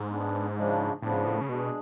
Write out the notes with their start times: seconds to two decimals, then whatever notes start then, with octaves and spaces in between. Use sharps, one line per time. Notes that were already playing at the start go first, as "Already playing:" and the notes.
Already playing: G#2
0.09 G#3 B3 D4
0.56 C#3 F3 G#3 D4
1.02 A2 C#3 F3 B3 D4
1.14 G#2
1.26 A2
1.41 C#3
1.48 B2 G#3 D4 G#4